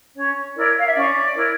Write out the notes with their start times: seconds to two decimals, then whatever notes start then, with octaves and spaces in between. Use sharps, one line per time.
0.15 C#4 C#5
0.54 E4 A#4 C#5 D5
0.77 F5
0.86 E5
0.94 C#4 D5
1.35 E4 A#4 C#5